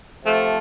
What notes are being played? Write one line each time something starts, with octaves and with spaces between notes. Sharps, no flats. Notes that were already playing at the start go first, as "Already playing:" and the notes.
C3 F3 A3